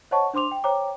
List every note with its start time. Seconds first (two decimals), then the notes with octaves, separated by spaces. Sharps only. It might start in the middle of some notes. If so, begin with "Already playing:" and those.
0.11 C5 C#5 D#5 F#5 A5 C#6
0.34 D4 C5 C6 D6 F7
0.51 G5
0.64 C5 C#5 G5 A#5 D6